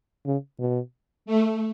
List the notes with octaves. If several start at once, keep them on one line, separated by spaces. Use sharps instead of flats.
C#3
B2
A3